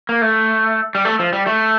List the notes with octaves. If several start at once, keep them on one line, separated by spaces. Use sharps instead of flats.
A#3
A3
G3
A3
F3
G3
A3